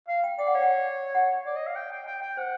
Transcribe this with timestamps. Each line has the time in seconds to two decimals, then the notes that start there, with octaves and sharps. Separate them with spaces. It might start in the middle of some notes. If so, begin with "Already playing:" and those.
0.08 F5
0.24 G5
0.39 D5 G5
0.47 F#5
0.55 C#5 F5
0.62 F#5
1.15 F#5
1.46 D5
1.56 D#5
1.67 F5
1.76 G5
1.92 G5
2.06 G5
2.22 G5
2.37 C5 F#5